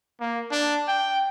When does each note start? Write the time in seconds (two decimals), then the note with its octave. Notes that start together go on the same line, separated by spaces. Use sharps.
0.20 A#3
0.51 D4
0.88 G5